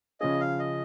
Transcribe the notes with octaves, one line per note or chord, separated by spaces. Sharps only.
C#3 F3 C#4 G#4 D#5
F5
D#5